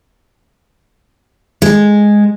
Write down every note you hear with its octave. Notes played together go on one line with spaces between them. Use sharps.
G#3